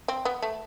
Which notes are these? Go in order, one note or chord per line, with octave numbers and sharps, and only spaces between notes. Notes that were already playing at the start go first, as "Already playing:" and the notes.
C4
B3
A3